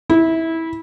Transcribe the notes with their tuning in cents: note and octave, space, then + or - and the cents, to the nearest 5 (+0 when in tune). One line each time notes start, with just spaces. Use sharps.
E4 -20